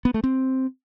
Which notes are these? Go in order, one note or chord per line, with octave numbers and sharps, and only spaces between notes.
B3
A3
C4